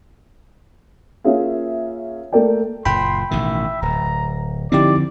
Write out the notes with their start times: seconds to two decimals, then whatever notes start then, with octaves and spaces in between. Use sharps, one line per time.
1.24 A#3 C#4 F4 G#4 E5 F5
2.32 A3 A#3 A4 A#4 D5 G5
2.85 F#1 A#2 G5 B5 C6
3.31 A1 B2 D#3 E5
3.82 D1 A#5
4.72 D3 F3 C4 D#4 E4 G4 D5